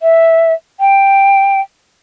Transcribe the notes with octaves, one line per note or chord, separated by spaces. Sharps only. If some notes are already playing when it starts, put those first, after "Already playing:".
E5
G5